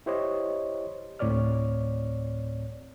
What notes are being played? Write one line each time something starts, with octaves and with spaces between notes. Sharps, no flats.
E4 G4 C5 C#5 D#5
D2 A2 C4 C#5 D5 F6